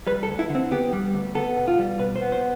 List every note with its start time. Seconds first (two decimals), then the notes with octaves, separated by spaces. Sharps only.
0.07 G3 B4
0.23 A4
0.28 D2
0.39 E4
0.49 D3
0.55 C4
0.71 B3 G4
0.93 G3
1.14 D2
1.35 B3 A4
1.57 B2
1.68 F4
1.79 G3
1.99 B2 B4
2.16 C5
2.21 B3
2.32 C5